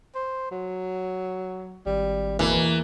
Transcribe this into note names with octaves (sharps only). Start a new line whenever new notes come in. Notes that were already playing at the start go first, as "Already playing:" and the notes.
C5
F#3
G#1 G3
E2 B2 E3 A#3